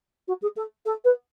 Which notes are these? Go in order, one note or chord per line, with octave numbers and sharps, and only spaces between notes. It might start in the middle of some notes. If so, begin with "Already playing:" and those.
F#4
G#4
A4
A4
B4